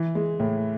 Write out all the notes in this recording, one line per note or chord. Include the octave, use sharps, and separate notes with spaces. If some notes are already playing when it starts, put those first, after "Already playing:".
Already playing: E3
G#3
A2